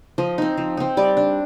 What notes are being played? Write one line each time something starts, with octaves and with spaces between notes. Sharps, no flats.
F3 D#5
C4 D#4
F3
C4 D#4
G3 D5
D4